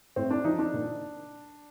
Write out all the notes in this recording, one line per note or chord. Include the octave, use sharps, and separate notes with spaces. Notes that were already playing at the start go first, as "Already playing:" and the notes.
A2 C4
D4
F3 D#4
D4
A#2